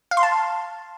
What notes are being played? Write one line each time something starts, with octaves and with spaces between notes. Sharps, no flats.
F5
C6
A5